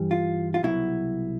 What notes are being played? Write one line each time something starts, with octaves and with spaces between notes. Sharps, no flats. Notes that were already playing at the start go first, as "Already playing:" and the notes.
Already playing: G2 E3 G3
F4
F4
C2 B2 F#3 E4